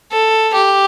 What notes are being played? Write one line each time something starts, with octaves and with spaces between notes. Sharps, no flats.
A4
G4